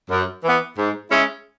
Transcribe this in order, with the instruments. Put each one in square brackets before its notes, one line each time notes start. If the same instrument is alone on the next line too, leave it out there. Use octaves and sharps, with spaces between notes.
[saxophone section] F#2
E3 B3
G#2
G#3 C#4 E4